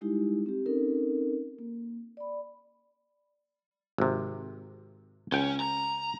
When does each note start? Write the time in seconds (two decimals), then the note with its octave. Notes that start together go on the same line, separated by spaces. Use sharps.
0.01 G3 G#3 D#4 E4 G4
0.46 C4 G4
0.66 C4 C#4 D#4 A4 A#4
1.59 A#3
2.17 D5 B5
3.98 G#1 C3
5.32 C#2 C#4 G5
5.60 A#5